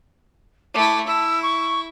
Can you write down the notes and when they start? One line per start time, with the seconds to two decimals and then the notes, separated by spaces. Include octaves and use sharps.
0.74 A3 E4 D6
1.07 E4 E6
1.42 C#6